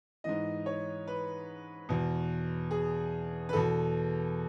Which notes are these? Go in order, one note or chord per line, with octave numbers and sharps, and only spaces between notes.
G#2 E3 D#5
C#5
B4
E2 B2
G#4
B4
E2 B2 A4